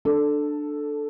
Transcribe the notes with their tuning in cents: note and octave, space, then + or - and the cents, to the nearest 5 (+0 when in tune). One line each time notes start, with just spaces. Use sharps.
D4 +15 A4 +0